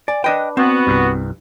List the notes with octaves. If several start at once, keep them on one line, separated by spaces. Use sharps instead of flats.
D5 G#5
D4 B4 D#5 G5
B3 C4 F#4
C2 G2